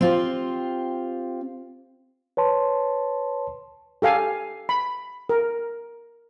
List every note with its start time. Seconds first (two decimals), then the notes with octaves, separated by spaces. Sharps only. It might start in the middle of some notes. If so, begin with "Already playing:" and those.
0.01 C4 F4 G4
2.37 B4 C#5 A5 C6
4.02 G4 A4 F5 G#5
4.69 B5
5.29 A#4